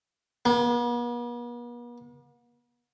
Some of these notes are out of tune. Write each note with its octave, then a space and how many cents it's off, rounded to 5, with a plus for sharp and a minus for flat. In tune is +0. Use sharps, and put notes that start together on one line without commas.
B3 -45